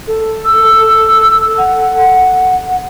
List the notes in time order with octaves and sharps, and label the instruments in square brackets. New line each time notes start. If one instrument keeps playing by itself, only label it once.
[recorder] A4
[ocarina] E6
F#5